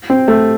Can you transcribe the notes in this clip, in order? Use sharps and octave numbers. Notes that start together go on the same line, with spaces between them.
C4
A3